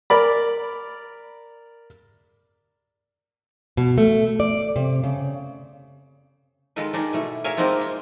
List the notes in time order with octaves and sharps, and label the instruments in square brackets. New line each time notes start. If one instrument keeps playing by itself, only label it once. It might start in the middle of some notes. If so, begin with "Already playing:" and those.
[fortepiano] A#4 D5 B5
[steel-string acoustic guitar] B2
A3
D5
C3
C#3
[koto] D#3 G#3 F4 A4 B4
D#3 D4 D#4 G#4
B2 A3 E4
G#4 A#4 C#5 E5 F5 G#5
G#3 A#3 C4 D4 D#4 F4
F4